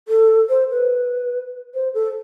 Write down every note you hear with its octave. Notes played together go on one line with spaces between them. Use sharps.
A4
C5
B4
C5
A4